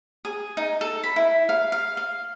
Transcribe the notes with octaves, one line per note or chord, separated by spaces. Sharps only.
G#4
D#4
A4
B5
E4
F5
F5
F5